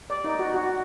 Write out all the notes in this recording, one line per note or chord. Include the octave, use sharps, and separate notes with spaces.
D5
D#4
F#4
F#4